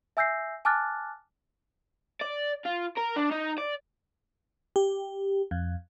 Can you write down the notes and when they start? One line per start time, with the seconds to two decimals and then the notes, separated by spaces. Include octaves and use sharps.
0.17 E5 G#5 E6 G6 A#6 C7
0.65 G#5 A5 D6 F6 F#6 A6
2.22 D5
2.66 F4
2.98 A#4
3.17 D4
3.32 D#4
3.58 D5
4.76 G4
5.51 F2